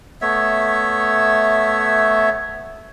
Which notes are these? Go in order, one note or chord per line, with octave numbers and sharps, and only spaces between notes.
A3 B3 C#5 E5